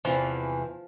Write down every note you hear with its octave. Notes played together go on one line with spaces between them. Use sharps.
E2 C3 E3 F3